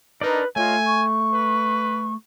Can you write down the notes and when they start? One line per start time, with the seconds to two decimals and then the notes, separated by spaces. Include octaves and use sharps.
0.21 D4 D#4 A#4 B4 D5 D#5
0.56 A3 F4 C#5 D#5 G#5
0.86 C#6
1.33 B4